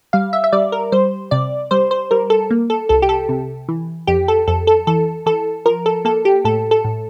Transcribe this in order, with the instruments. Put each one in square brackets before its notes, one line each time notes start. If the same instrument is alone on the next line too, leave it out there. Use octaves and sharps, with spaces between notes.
[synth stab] G3 F5
E5
E5
G3 D5
A#4
G3 C5
C3 D5
G3 C5
C5
G3 A#4
A4
A#3
A4
C2 A4
G4
A4
C3
E3
F2 G4
A4
F2 A4
A4
E3 A4
E3 A4
F3 A#4
A4
A#3 A4
G4
A2 A4
A4
A2